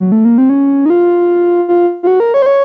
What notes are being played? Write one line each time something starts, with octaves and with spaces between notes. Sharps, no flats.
F#3
A3
A#3
C4
C#4
D#4
F4
F4
F4
F#4
A#4
C#5
C5
C#5